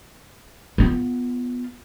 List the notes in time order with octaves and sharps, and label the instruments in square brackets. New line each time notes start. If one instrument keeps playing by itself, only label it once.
[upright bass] B3 F4